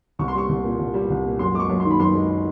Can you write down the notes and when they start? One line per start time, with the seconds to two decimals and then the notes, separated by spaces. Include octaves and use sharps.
0.19 C2 C#6
0.28 C6
0.34 G3 C#6
0.49 C2
0.63 A#2
0.79 C2
0.94 G3
1.10 C2
1.24 A#2
1.39 F#2 C6
1.54 G#3 D6
1.60 C#6
1.70 F#2
1.80 D#3 C6
1.91 B5
2.00 F#2 C6
2.15 G#3